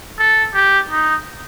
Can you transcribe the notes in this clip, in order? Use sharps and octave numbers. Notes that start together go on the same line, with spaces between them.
A4
G4
D#4